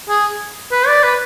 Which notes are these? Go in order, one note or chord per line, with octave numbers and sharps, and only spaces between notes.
G#4
B4
D5
B4